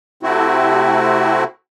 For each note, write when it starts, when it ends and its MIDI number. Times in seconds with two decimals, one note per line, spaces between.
0.23 1.44 48
0.23 1.44 57
0.23 1.44 60
0.23 1.44 64
0.23 1.44 66